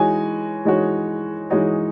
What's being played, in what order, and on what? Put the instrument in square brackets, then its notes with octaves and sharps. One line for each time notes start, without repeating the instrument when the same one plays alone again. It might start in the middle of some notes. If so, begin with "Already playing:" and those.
Already playing: [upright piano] E3 G#3 D#4 F#4 C#5 [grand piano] G#5
[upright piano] E3 G#3 D#4 F#4 C#5
E3 G#3 D#4 F#4 C#5